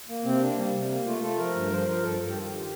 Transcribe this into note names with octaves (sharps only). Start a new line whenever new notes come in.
A#3
C3 C4
A#3 D4
G3
C3
A#3
A3 F4
A3 A4
F3 A#4
G2
F3 C5
F3 A#4
G2 A4
G2 A4
G4
D#3 F4
D#3 G4